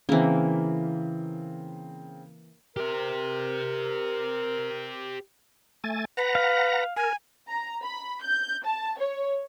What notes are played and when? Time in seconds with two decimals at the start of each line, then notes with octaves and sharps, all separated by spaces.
0.09 C#3 E3 A#3 C4
2.77 G4 A#4 C5
5.84 A3 G#5 A6
6.17 B4 F#5 A#5 A#6
6.35 F5
6.96 A#4 G#5
7.48 A#5
7.84 B5
8.23 G6
8.65 A5
8.99 C#5